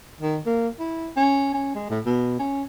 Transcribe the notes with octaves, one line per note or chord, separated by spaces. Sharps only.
D#3
A#3
E4
C#4
C#4
G#3
A2
B2
C#4